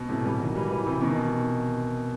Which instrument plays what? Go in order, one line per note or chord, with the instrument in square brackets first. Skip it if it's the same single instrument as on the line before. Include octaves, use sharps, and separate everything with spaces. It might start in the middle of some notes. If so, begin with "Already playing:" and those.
Already playing: [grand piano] B2
A2 C3
E3 G3
D#3 F#3
E3 G3
E3 G3
C3 E3
B2 D#3